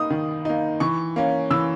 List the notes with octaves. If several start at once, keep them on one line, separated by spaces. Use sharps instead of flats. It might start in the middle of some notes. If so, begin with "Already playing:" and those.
Already playing: A#3 D#4 D#6
D#3
A#3 D#4
E3 C#6
A#3 C#4
E3 E6